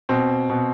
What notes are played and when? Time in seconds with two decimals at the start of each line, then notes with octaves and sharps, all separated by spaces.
0.09 B2 C4
0.50 B2